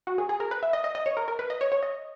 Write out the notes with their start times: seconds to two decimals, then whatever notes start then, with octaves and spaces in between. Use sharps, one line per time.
0.07 F#4
0.18 G#4
0.29 G#4
0.40 A#4
0.51 B4
0.63 E5
0.73 D#5
0.84 D#5
0.95 D#5
1.06 C#5
1.17 A#4
1.28 A#4
1.39 B4
1.50 D#5
1.61 C#5
1.72 C#5
1.83 D#5